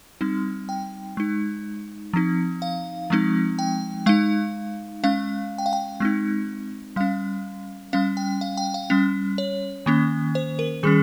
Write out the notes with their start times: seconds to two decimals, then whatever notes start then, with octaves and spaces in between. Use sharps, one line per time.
0.21 G3 C4 D#4
0.69 G5
1.17 G#3 D#4
2.13 F3 C4 D#4
2.62 F5
3.10 F3 G#3 C4 D#4
3.59 G5
4.06 G#3 D#4 F5
5.04 G#3 C#4 F5
5.58 G5
5.66 F5
5.73 G5
6.00 G#3 C4 D#4
6.96 G3 C#4 F5
7.93 G3 C#4 F5
8.17 G5
8.41 F5
8.57 G5
8.74 F5
8.90 G3 C#4
9.38 C#5
9.86 D#3 A#3 C#4
10.35 C5
10.59 A#4
10.83 D#3 G3 C#4 G#4